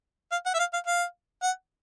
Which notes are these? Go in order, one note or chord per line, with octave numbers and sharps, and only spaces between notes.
F5
F#5
E5
F5
F5
F5
F#5